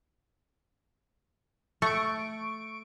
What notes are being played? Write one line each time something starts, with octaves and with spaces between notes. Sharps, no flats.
A3 C#6 D7